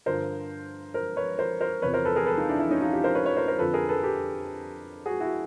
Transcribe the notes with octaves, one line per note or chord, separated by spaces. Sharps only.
G2 D3 F3 A#4 C5
A#4 C5
B4 C#5
A#4 C5
A#4 C5
E2 C3 F3 B4 C#5
A#4 C5
A4 B4
G#4 A#4
A4 B4
D#4 F4
D4 E4
D4 E4
C#4 D#4
D#4 F4
F4 G4
A#4 C5
B4 C#5
B4 C#5
A#4 C5
A#4 C5
F2 D3 F3 A4 B4
G#4 A#4
A4 B4
G4 A4
F#4 G#4
E4 F#4